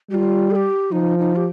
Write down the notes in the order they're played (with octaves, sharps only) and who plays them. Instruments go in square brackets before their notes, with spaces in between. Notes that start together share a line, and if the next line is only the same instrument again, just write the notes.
[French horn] G3 [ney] F4 G4
[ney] A4
G4
[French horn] F3 [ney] D#4
[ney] D#4
G4